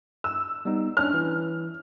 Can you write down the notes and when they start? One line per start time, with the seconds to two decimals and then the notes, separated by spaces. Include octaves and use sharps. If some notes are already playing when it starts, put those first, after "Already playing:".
0.24 E6
0.65 G3 B3 D#4
0.97 C#4 D4 C#5 F6
1.14 E3